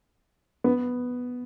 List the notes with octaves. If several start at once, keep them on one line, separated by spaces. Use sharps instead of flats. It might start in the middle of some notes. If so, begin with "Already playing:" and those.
B3